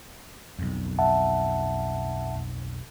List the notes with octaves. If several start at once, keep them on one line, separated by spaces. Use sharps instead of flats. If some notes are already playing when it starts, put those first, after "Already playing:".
B1 F2
E5 F#5 A5